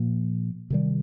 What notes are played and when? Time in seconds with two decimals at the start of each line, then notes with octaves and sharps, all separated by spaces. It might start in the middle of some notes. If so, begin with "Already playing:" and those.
Already playing: A#2 F3 A#3
0.70 C3 D#3 G3